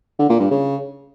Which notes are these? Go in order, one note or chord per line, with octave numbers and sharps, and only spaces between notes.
D3
A#2
G2
C#3